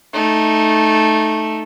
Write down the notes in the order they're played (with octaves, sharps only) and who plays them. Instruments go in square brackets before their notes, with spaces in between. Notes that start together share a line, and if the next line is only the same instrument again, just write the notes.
[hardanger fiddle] A3 D#4